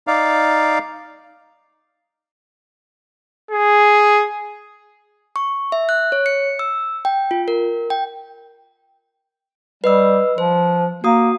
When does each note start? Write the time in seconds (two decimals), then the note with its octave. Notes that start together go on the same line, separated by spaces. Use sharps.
0.07 D#4 D5 F5
3.51 G#4
5.36 C#6
5.72 E5
5.89 F#6
6.12 C#5
6.26 C#7
6.59 E6
7.05 G5
7.31 F4
7.48 A#4
7.90 G5
9.84 G3 B4 D#5 E6
10.38 F3 C5
11.04 A#3 F#4 D#6